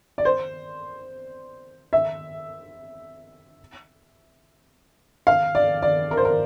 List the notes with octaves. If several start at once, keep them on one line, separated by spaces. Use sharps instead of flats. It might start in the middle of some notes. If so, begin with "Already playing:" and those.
D5
C5
E5
F5
D5
D5
A#4
C5
A#4